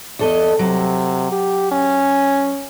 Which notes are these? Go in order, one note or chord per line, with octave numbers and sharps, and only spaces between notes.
E2 A4 D#5
C3 F#3
G4
C#4